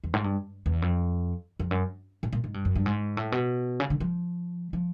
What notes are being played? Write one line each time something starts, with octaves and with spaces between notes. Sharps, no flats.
E2
G#2
G2
E2
F2
F2
F#2
A2
A#2
G#2
G2
F#2
G2
G#2
A2
B2
C#3
D3
F3
F3